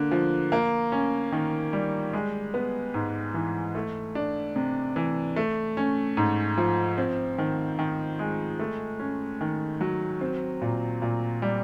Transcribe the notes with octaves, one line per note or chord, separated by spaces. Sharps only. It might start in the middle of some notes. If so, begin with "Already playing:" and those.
Already playing: D3 A#3
F3
A#3
C#4
D#3
G3
G#3
B3
G#2
E3
A3
D4
C3
E3
A3
C#4
G#2
F3
C4
D#3
D#3
G#3
A3
C#4
D#3
F#3
C4
A#2
A#2
G3